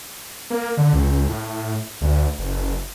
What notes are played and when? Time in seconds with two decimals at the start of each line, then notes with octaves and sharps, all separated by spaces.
0.50 A#3
0.77 D3
0.93 C#2
1.28 A2
2.01 D2
2.38 F#1